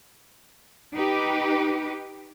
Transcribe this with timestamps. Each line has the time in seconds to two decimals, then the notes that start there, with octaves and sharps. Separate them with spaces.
0.96 D#4 G4 B4